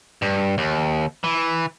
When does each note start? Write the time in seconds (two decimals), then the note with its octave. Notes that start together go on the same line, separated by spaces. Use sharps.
0.22 G2
0.58 D#2
1.24 E3